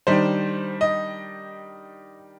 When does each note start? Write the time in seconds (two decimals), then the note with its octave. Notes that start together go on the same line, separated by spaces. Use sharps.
0.07 D#3 G3 D4 C5
0.81 D#5